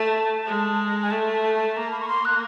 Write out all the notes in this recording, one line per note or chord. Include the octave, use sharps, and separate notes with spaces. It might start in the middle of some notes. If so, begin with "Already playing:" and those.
Already playing: A3 A5
G#3
G#5
A3 A5
A5
A5
A#3 A#5
B5
C#6
C6
F#6